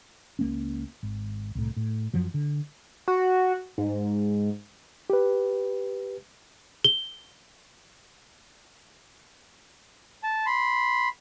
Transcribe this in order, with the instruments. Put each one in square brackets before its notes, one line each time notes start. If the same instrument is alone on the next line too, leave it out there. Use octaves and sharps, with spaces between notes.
[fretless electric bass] C#2 A#3 C#4
G#1
C2 A2
A2
F#2 F3 F#3
D3
[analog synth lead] F#4
G#2
[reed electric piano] G4 B4
[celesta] G7
[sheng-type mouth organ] A5
B5 C6